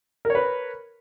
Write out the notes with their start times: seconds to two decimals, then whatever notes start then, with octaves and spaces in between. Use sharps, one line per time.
0.25 A#4
0.30 C#5
0.35 B4